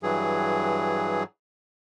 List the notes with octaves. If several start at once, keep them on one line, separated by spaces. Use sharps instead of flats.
G2 E3 F#3 G#4